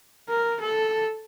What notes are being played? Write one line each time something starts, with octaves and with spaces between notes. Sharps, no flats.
A#4
A4